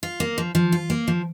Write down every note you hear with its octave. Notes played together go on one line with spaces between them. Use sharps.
F4
A#3
F3
F3
F4
A#3
F3